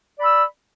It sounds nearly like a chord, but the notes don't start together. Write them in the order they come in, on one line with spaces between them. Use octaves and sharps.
D5 B5 E6